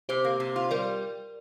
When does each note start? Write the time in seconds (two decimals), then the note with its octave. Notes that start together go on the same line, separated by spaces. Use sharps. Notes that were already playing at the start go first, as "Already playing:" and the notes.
0.09 C3 G4 C5
0.24 A#3
0.40 C3
0.56 F4
0.71 G3 A#4 D5